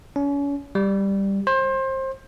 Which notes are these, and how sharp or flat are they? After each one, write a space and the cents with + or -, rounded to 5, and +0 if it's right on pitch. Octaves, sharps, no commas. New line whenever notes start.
C#4 +35
G3 +5
C5 +25